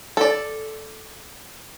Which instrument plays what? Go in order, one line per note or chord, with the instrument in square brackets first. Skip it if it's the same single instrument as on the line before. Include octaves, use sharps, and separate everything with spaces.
[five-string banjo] A4 D5